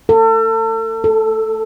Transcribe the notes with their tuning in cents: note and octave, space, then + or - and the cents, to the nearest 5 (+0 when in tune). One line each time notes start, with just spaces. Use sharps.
A4 +35
A4 +0